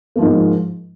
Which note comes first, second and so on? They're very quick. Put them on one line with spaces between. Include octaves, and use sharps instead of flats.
A#3 F3 G#2 G#3